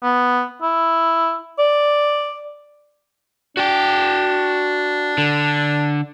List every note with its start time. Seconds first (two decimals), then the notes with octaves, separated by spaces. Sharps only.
0.03 B3
0.62 E4
1.59 D5
3.57 D4 F#4 G5
5.18 D3